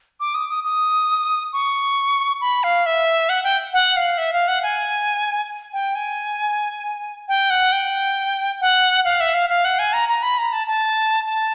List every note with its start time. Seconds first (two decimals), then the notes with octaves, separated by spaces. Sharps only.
0.20 D6
0.35 D#6
0.49 D#6
0.64 D#6
1.53 C#6
2.41 B5
2.64 F5
2.86 E5
3.29 F#5
3.44 G5
3.73 F#5
3.97 F5
4.18 E5
4.33 F5
4.48 F#5
4.63 G#5
5.73 G5
5.95 G#5
7.28 G5
7.50 F#5
7.72 G5
8.61 F#5
9.05 F5
9.20 E5
9.34 F5
9.50 F5
9.65 F#5
9.79 G#5
9.93 A#5
10.09 A#5
10.23 B5
10.38 A#5
10.53 A5
10.67 A5
11.26 A5